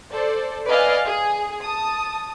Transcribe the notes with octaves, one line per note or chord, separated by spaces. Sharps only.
A4 C5 D5
B4 D5 D#5 F5 G#5 F6
G#4
A5 D#6